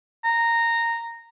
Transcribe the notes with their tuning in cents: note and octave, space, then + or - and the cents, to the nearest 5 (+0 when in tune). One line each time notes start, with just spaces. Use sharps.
A#5 -10